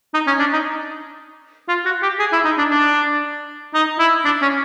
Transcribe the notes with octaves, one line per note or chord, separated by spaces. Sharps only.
D#4
C#4
D4
D#4
F4
F#4
G4
G#4
E4
D#4
D4
D4
D#4
E4
D4
C#4